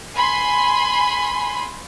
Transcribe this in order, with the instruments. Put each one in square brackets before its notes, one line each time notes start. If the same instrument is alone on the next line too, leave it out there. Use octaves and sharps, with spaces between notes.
[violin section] G#5 B5 C6